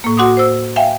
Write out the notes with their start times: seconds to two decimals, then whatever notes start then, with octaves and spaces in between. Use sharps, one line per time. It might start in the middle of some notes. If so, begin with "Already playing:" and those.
0.04 A2 A#3
0.17 F#4 F#5 C6 D6 D#6
0.37 C5 E6
0.76 E5 F5 G5 G#5